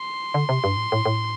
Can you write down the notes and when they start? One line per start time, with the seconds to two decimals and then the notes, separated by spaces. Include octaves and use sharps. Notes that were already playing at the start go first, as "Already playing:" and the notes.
Already playing: C6
0.34 D3
0.49 C3
0.64 G2
0.77 A2
0.92 A2
1.06 A2